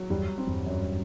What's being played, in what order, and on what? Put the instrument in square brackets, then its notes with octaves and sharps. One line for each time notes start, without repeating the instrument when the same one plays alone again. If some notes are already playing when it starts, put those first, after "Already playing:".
Already playing: [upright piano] F#3
[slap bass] E2 G2 [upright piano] G3
[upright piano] C4
[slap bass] E2 G2
[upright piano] F#2